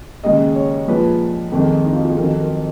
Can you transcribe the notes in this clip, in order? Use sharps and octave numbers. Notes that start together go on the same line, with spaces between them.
D#2 C#3 G#3 D#5
C#5
A#2 F3 G#3 B4
F2 D#3 G#3
D#4
F4
F#4
G#4
F2 D#3 F#3 A#4
A#4